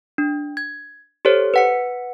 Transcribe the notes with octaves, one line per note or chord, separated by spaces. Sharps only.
D4
G#6
G4 A4 C5 C#5
B4 F#5 C#7